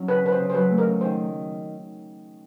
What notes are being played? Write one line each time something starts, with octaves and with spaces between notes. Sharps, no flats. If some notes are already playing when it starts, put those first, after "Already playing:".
Already playing: F#3 C#4
C#3 B4
C#3 B4
C5
C#3
C5
F#3 B4
A3
A#4
C#3
D#3 C5